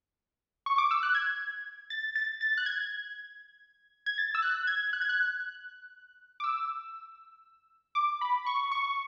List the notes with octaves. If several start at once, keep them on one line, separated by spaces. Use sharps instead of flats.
C#6
D6
E6
F#6
G#6
A6
A6
A6
F#6
G#6
G#6
A6
E6
F#6
G#6
F#6
G#6
F#6
D6
E6
D6
B5
C#6
C#6